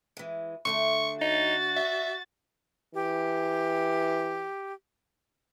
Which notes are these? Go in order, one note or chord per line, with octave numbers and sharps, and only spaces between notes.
E3 G#3
D3 A3 D4 C#6
D#4 F#4 A6
E5
E3 G4